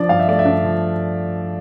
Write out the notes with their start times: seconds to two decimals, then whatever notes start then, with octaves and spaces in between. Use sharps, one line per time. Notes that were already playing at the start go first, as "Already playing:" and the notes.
Already playing: F3 D4 D5
0.09 G2 F5
0.20 E5
0.28 A3 D5
0.39 E5
0.45 D4
0.64 F3